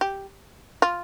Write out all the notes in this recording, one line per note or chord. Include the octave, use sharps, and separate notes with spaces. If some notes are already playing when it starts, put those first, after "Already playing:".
G4
F4